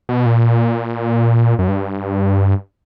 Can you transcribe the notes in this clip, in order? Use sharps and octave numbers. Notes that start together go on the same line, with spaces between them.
B2
A#2
F#2
G2